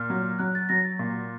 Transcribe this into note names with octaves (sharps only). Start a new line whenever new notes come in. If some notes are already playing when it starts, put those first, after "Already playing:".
Already playing: A#2 F6
F#3
F#3 F#6
A6
F#3 A#6
A6
A#2